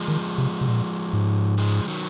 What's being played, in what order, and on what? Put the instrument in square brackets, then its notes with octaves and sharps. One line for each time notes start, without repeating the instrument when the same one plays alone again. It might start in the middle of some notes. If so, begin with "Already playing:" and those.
Already playing: [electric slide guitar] F3 G#3
[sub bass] D#3
C3
C3
A#2
G#2
[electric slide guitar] F3 G#3
D#3 F#3